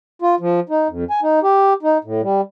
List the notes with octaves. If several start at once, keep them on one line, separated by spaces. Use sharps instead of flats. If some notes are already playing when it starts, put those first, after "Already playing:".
F4
F3
D#4
F2
G#5
D#4
G4
D#4
A2
G3